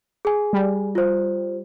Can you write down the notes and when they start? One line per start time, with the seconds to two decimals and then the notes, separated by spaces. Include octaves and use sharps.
0.25 G#4 G#5
0.53 G3
0.95 F4 C5